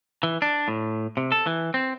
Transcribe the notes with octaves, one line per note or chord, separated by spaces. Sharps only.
E3
D4
A2
C3
A4
E3
C4